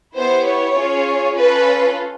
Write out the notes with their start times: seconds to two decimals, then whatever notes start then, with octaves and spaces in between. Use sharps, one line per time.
0.15 B3 E4 G4 C5
0.46 C#5
0.76 C#4 F4 G#4
1.36 C#4 F4 A4 B4